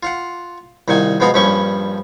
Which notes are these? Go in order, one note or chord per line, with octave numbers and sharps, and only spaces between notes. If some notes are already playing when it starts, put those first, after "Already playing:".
F4 F5 F#5
C2 A#2 D#3 F#5 G#5
B2 F3 G#3 B3 F#4 F5
A#1 G2 F3 C#4 B5 C#6